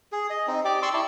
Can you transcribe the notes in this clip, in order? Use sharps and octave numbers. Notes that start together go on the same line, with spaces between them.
G#4
D#5
C4 D#4
G4 D5 D6
D5 C6 C#6 E6
E4 D5 A5